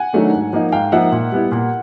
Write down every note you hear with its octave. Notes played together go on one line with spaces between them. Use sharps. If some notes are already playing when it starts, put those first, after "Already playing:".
Already playing: F#5 G#5
D#3 F#3 A3 D4
G#2
F3 A#3 D#4
G#2 F5 G5
F3 A#3 D#4 E5 F#5
A#2
G3 B3 E4
A#2